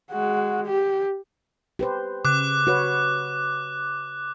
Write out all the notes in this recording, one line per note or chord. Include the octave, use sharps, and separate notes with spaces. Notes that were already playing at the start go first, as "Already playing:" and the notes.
G#3 F#4
G4
G4 B4 C5
C#3 D6 F#6
F#4 B4 C#5